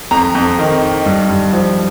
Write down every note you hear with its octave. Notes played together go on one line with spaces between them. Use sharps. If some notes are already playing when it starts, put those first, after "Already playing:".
F2 A#5
F2
D#3
D#3
G2
G2
F3